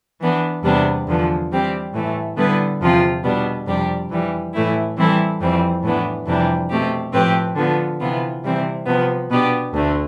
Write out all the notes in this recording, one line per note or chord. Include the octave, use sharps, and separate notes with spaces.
E3 B3 D4
E2 C3 G3 B3 D4
E2 D3 F3 B3
E3 G3 C4 G4
A2 E3 A3
D3 G3 B3 E4 B4
E2 C3 F3 C4 F4
B2 G3 B3 D4
F2 C3 G3 D4 G4
F2 E3 G3
A2 E3 A3 E4
E3 G3 C4 E4 A4
F2 E3 G3 C4
A2 E3 B3 D4
F2 C3 E3 G3 D4
B2 A3 C4 G4
A2 F3 C4 G4 B4
D3 F3 B3
C3 E3 B3 F4
C3 E3 G3 C4 E4
C3 F3 B3
B2 B3 D4 G4
D2 D3 A3